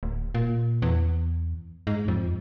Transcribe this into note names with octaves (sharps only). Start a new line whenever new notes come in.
D1
A#2
E2
G#2
F2